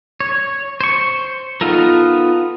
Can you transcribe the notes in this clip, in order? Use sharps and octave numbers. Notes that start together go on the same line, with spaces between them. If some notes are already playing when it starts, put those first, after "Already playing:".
C#5
C5 C#6
B3 D#4 F4 A4 A#4